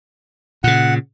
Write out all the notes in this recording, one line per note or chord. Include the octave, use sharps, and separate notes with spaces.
A#2 C#3 F#5